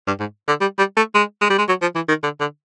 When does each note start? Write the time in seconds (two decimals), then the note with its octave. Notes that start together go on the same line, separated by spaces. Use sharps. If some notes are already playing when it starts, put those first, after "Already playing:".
0.07 G2
0.20 G#2
0.48 D3
0.61 G3
0.79 G3
0.96 A3
1.15 G#3
1.42 G#3
1.50 G3
1.58 G#3
1.68 F#3
1.82 F3
1.95 E3
2.08 D#3
2.23 D3
2.41 D3